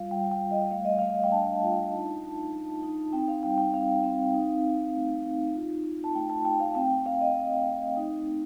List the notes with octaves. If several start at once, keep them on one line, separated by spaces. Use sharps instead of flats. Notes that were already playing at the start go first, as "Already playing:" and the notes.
Already playing: G3 F4 F5
G3 G5
G5
G3
D#5
A3 F5
D#5
A3 F5
G5
D4 A5
F4
D#4
D#4
D#4
D#4
C4 G5
F5
G3 G5
G5
C4 F5
C4
D#4
D#4
A3
D#4
F4
F4
A5
A3 G5
A5
A3 G5
F5
C4 G5
G5
C4 F5
D#5
C4
A3
D#4
D#4